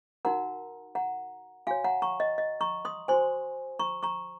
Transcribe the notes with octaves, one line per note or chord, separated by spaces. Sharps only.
D#4 F#4 A#4 F#5 A#5
F#5 A#5
F#4 C#5 F5 G#5
F#5 A#5
A#5 C#6
D#5
D#5
A#5 C#6
C6 D#6
F#4 C5 G#5 C6
A#5 C#6
A#5 C#6